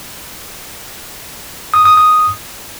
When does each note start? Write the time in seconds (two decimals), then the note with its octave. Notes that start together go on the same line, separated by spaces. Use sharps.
1.74 D#6
1.85 D#6
1.97 D#6